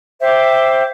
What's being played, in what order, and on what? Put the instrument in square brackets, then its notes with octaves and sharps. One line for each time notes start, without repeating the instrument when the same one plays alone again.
[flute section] C5 E5 G5 D6